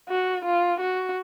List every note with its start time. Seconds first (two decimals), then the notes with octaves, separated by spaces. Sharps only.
0.09 F#4
0.45 F4
0.80 F#4